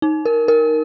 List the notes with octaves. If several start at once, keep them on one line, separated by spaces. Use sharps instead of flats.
D#4
A#4
A#4